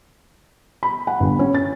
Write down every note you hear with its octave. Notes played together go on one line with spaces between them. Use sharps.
B5
F#5
G1
C#4
A6